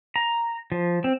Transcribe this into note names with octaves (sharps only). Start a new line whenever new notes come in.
A#5
F3
C4